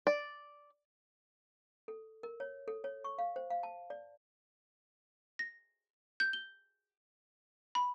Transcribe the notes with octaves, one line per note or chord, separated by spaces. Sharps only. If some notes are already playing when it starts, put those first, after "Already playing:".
D5
A4
A#4
C#5
A4
C#5
C#6
F5
C5
F5
A5
D5
A#6
G6
G7
B5